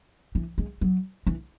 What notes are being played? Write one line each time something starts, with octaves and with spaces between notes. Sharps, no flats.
E3
G#3
F#3
E3